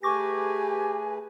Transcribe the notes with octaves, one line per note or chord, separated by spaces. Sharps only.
A3 G4 G#4 B4 G#5 C#6 D6 A#6